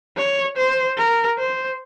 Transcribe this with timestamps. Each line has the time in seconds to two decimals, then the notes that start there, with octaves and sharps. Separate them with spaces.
0.17 C#5
0.57 C5
0.98 A#4
1.38 C5